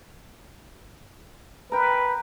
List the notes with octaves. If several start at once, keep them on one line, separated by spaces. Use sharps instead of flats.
A#4 B4 G5